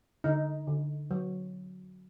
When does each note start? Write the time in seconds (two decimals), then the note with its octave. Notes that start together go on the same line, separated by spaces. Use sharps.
0.24 D3 D#4
0.67 D3
1.11 F#3